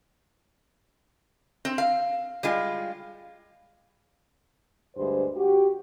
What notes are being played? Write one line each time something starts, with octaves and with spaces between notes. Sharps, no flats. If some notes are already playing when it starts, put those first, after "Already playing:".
C4
F5
G3 G#3 F4
D2 G2 G#3 C5
F#4 G4